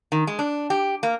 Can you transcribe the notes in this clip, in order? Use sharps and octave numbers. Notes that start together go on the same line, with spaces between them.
D#3
G#3
D4
G4
A#3